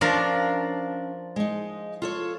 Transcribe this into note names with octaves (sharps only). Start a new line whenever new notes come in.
F3 C#4 D4 A#4 F5
G#3 D#4
F4 A4 C#5